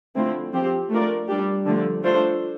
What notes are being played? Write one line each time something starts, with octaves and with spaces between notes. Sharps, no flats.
D3 F3 A3 C4 E4
F3 C4 G4 C5
A3 D4 F4 A#4 D5
G3 D4 G4
D3 F3 A3
A3 D4 F4 A4 C5